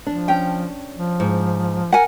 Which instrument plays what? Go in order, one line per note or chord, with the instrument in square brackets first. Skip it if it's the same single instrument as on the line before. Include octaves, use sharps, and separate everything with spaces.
[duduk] F3 [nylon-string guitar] D4
[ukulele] C#4 G5
[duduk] F3
[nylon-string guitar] G#2
[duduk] A#4 [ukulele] F#5 G#5